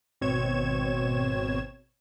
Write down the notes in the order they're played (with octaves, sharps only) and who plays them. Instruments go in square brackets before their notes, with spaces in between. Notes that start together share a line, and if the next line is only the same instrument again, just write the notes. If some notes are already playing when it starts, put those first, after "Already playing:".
[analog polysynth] G#1 B2 C4 C#5 G#6 E7